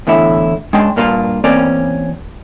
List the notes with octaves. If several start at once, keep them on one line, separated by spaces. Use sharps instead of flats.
E2 A2 D3 E4 E5
G#3 C#4 D4 G5 C6
G2 A#2 A#3 D4 F4
E2 A#3 C4 C#4 A#4 D5